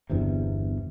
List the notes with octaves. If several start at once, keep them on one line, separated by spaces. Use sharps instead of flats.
G1 E2 G2 C3